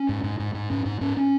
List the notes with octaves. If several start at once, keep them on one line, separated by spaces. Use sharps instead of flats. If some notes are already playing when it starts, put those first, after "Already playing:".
Already playing: C#4
G#2
G#2
G#2
G#2
G#2 C#4
G#2
G#2 C#4
C#4